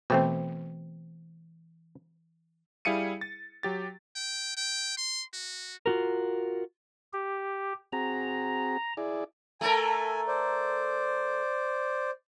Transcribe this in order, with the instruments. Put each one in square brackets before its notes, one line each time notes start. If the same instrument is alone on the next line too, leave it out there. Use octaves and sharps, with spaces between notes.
[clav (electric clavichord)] B2 A3 C4 [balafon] E3 C5 G5
[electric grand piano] G3 E4 G#4 F5 C#7 D#7
A6
F#3 G4 A6
[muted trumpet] G5
G5
C6
F#4
[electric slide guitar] F4 F#4 A#4
[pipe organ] G4
[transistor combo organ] C4 F#4 G#4 [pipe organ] A#5
[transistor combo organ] E4 G#4 D5
[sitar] A3 A4 A#4 [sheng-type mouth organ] G#5
[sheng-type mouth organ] C5 D5